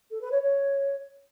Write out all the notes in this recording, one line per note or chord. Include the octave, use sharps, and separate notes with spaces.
A4
B4
C#5
C#5